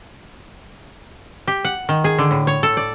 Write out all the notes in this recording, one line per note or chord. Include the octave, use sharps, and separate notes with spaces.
G4
F#5
D#3
G#4
D3
A2
C#5
A4
D5